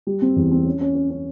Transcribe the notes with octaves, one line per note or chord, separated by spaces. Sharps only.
G3
C4
E2
C4
C#4
C#4
C#4
C#4